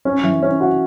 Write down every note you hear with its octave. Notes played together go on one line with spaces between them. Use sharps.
C#4
E3
C#4
F#4